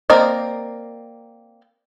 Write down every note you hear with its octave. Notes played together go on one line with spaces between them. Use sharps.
A#3 C4 A#4 D5 D#5